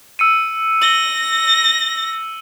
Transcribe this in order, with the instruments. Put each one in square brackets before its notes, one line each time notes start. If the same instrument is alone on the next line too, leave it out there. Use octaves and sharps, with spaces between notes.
[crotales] E6 C#7 D#7
[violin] A#6 [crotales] F#7 G7